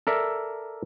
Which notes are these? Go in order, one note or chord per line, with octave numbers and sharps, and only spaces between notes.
A4 A#4 D5 E5